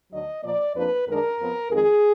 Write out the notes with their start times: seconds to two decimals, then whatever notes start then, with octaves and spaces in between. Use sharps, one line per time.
0.10 D2 D3 F#3 D4 D#5
0.42 A#2 F3 A#3 D5
0.74 F2 F3 A#3 D4 B4
1.06 F#2 D#3 G#3 D4 A#4
1.39 F2 F3 B3
1.70 F2 D#3 G#3 G#4